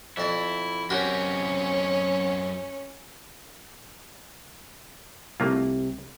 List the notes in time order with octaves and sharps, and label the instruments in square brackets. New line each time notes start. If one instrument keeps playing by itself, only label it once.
[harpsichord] F2 D5 [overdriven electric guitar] E4
[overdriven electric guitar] F#2 C4 [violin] C#4 [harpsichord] F#4 G4 A#4
[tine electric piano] C2 C3 [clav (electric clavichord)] A3 A#3 F4